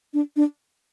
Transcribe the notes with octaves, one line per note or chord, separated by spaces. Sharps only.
D4
D4